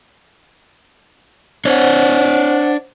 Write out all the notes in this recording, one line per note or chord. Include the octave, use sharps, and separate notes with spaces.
D4 C5 C#5 F#5